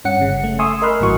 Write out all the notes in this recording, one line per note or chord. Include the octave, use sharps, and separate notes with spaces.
G2 C#4 F#5 C#7
G1 C#3
A3
E5 G#5 C6 C#6 D#6 E6
A#4 D#5 B5 C6 F6 F#6
A1 G2 A#2 E3 F#4 C#6